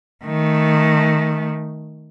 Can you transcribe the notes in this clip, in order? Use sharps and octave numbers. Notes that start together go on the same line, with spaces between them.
D#3 A3